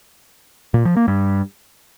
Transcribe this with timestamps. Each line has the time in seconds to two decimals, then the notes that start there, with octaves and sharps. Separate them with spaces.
0.74 A#2
0.85 F3
0.97 A#3
1.08 G2